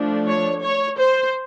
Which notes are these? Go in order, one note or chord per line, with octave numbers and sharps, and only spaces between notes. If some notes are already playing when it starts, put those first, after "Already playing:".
Already playing: F3 A3 D4
C#5
C#5
C5